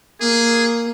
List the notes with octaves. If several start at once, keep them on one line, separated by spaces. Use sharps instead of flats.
A#3 G#4